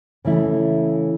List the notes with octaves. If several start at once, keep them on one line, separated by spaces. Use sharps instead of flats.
C#3 E3 A3 E4